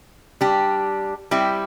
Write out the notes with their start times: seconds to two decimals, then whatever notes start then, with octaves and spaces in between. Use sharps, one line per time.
0.41 G3 D4 G4
1.31 G3 C4 E4 G4